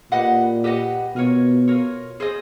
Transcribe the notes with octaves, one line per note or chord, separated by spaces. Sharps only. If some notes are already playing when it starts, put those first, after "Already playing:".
A#2 G4 B4 D#5 F#5
G4 B4 D#5 F#5
B2 F4 A#4 C#5
F4 A#4 C#5
G#4 C5 D#5